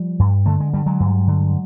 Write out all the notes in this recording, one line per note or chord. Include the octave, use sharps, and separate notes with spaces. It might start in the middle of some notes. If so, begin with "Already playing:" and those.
Already playing: F3 G3
G2
D3 A3
G#3
G2 G3
F#3 G#3
G2
D3